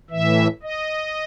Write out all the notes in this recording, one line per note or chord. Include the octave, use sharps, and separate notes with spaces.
A2 E3 E5
D#5